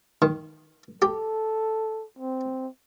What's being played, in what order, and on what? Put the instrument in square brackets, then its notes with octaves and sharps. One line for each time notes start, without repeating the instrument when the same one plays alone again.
[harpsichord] D#3
[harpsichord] G4 [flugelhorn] A4
[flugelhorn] C4